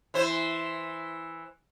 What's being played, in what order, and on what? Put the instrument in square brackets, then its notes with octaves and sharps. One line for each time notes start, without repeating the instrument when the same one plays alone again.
[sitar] E3 C5